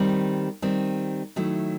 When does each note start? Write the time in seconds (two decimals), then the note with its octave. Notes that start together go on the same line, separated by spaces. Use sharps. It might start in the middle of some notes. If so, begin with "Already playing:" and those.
Already playing: D#3 G3 C4
0.62 D#3 G3 C4
1.36 D#3 F#3 A3 E4